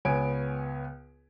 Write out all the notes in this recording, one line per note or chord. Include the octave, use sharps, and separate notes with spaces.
C#2 B3 C#5 G#5 D7